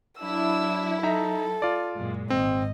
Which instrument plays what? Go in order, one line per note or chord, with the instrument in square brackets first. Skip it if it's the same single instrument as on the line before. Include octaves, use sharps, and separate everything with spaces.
[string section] F#3 E4 [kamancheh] D4 E6
[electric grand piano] D#4 E5 A#5 [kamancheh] A4
[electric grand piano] F4 D5
[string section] F#2 A#2 G#3
[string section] G#1 [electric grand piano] C4 [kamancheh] D#5